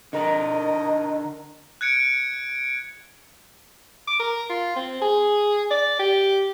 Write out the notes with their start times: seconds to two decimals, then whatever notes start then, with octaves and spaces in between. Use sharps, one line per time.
0.13 D3 A#4 D#5
1.81 F#6 G#6 C#7 D7
4.07 D6
4.19 A#4
4.50 F4
4.76 C4
5.01 G#4
5.70 D5
5.99 G4